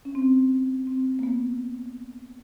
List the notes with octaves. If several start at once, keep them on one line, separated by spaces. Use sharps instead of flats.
C#4
C4
C4
A#3
B3